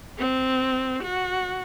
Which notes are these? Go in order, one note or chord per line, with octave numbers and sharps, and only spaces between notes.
C4
F#4